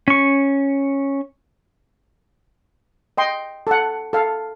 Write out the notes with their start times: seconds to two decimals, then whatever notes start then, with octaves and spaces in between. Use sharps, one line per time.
0.08 C#4 C#6
3.17 D#5 G5 C6
3.67 A4 F#5
4.13 A4 F5